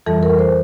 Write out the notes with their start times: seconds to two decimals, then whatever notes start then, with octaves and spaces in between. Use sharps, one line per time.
0.06 F2 E3 G3 A4
0.23 A#4
0.39 C5